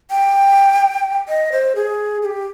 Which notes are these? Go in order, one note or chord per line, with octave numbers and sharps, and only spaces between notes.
G5
D#5
C5
G#4
G#4
G4